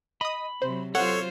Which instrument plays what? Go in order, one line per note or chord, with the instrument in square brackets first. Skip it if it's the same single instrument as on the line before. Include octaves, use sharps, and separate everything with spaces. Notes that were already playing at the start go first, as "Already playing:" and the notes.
[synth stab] D#5 D#6 [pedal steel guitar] B5
[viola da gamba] C3 F#3 [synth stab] C5
[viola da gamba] F#3 F4 C5 [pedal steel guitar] A4 [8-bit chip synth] C#5 [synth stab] F#5